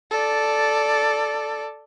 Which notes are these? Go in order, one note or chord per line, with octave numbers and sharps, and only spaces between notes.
A4 D5